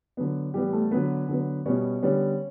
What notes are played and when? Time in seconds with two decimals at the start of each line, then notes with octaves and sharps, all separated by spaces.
0.17 D3 F#3 B3
0.54 A2 E3 G3 B3 G4
0.73 A3 A4
0.91 D3 F#3 B3 B4
1.28 D3 F#3 B3
1.66 B2 G3 B3 C#4 C#5
2.02 D3 G3 B3 C#4 C#5